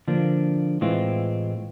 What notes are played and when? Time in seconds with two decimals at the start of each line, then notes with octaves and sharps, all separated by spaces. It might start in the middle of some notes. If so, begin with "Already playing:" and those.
0.08 D3 F3 A#3 D4
0.81 A2 E3 G#3 C4 F4